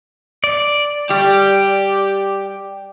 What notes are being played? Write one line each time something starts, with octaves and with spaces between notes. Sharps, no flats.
D5
G3 G4